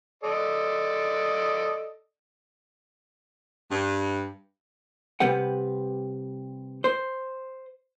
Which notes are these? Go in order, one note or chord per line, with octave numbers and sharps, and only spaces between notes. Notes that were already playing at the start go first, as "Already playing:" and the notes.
A4 D5 D#5
G2
C3 G3 G4 B4 F#5
C5